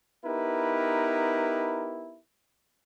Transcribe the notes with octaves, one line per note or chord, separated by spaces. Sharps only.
B3 D#4 E4 G4 A#4 B4